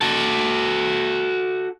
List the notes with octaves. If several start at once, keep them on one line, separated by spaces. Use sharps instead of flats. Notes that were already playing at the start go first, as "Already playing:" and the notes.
F#4 A4